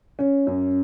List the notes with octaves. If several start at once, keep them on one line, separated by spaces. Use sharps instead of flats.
C#4
F#2